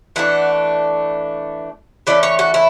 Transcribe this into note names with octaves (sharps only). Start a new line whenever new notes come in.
E3 A3 D4 F#5
E3 A3 C#4 D5
C#5
F#4
E4